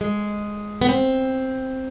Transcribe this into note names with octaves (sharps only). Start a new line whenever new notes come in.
G#3
B3
C4